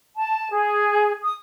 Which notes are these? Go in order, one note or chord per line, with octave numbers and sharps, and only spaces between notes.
A5
G#4
D#6